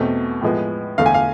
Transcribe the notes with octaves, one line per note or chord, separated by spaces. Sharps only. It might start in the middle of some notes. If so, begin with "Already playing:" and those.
Already playing: E2 B2 A3 C4
A2 F3 G#3 B3
E2 D3 A3 F5
G#5
F5